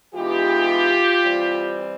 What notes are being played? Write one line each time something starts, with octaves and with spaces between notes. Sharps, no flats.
E3 G#3 B3 D#4 F4 G4
E3 G3 C4